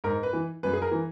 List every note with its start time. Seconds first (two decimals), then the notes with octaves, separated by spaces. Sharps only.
0.04 G#2 A#4
0.23 B4
0.33 E3
0.63 F#2 B4
0.73 G#4
0.82 A#4
0.91 E3